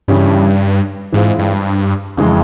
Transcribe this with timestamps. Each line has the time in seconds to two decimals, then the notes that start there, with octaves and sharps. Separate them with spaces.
0.08 G2 C#3 E3 G3 C#4 G4
1.12 G#2 E3 G#3 C4 F4
1.39 G2
2.17 F2 C#3 E3 G#3